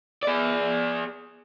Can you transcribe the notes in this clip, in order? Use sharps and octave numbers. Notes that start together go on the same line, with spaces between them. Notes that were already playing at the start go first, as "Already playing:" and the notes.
G#4 D5